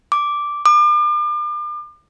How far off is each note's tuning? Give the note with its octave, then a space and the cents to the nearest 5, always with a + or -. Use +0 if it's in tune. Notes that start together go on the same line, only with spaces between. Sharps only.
D6 -5
D6 +40